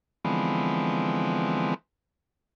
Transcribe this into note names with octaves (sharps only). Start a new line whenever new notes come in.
D3 E3 F3 G#3 B3 C4